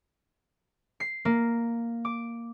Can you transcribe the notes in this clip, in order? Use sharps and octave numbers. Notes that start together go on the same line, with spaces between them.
C7
A#3
D6